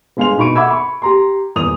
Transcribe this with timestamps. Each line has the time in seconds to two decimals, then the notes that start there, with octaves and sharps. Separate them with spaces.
0.17 G1 G#3 F5 C6 F7
0.37 B2 D#4 B5 C#6 D7 D#7
0.55 E5 F#5 B5 D6 E6 G#6
0.71 B5 C#6
1.02 G4 A#5 C6
1.56 D#1 E2 D#6 F7